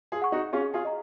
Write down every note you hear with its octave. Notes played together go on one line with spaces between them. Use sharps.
F4 G#4
F#5 C#6
D#4 F#4
C#4 F4 G#4
F4 G#4
D#5 A#5